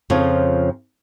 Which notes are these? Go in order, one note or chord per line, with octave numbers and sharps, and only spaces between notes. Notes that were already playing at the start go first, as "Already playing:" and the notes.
F2 C#3 F3 F4 C#5